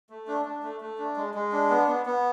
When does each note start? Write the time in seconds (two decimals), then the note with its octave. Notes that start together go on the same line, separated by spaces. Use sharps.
0.10 A3
0.27 D4
0.45 D4
0.63 A3
0.81 A3
0.98 D4
1.16 G#3
1.34 G#3
1.52 D4
1.70 B3
1.88 B3
2.06 B3